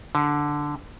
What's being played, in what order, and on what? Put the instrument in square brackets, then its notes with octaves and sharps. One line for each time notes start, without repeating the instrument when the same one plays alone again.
[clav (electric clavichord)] D3